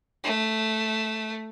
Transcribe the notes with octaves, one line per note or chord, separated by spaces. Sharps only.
A3